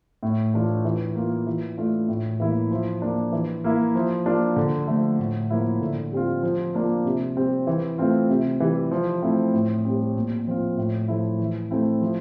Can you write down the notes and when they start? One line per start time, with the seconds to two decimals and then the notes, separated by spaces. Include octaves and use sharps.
0.23 A2
0.54 E3 A3 D4 F4
0.85 E3
1.15 A#3 F4
1.47 E3
1.77 A3 D4 F4
2.09 A2
2.40 E3 A#3 E4
2.71 F3
3.02 A#3 D4
3.32 E3
3.64 A#3 E4
3.95 F3
4.26 A#3 D4 F4
4.56 D3
4.88 F3 A3
5.18 A2
5.50 F3 A#3 E4
5.81 D3
6.12 G3 C4 F4
6.43 F3
6.74 A#3 D4 F4
7.05 C3
7.36 G3 C4
7.67 E3
7.98 A3 C4 F4
8.30 C3
8.60 E3 G3
8.92 F3
9.22 A3 C4 E4
9.54 A2
9.85 G3 C4
10.15 A#2
10.47 F3 C4 F4
10.77 A2
11.08 F3 A3 E4
11.39 E3
11.71 A3 C4 E4
12.01 F3